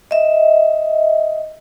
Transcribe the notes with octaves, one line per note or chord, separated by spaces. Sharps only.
D#5 E5